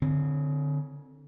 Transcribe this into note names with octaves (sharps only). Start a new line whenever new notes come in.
D3 C4